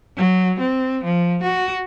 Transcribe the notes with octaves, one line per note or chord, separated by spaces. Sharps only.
F#3
C4
F3
F#4